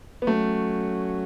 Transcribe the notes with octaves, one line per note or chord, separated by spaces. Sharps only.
B3
F#3 A3 C#4 F#4